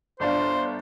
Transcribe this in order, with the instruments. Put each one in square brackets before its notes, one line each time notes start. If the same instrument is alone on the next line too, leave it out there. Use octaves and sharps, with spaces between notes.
[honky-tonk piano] G1 D4 F4 [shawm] C5